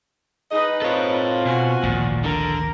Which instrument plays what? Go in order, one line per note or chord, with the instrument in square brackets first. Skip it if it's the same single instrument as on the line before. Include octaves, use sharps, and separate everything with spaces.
[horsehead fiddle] D#4 B4 [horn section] G#4 D#5
[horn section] C4 F4 [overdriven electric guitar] A4 C#5
[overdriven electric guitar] B2 [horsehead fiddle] F#4 G#5
[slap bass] G#1 D2 F3 [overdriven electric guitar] A#2
[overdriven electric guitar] D3 [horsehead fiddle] A#4